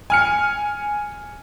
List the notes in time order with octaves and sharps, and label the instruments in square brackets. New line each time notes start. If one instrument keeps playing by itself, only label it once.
[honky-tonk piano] G#5 F6 C#7